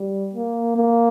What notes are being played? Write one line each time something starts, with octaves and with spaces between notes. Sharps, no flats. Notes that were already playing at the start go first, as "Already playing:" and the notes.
Already playing: G3
A#3
A#3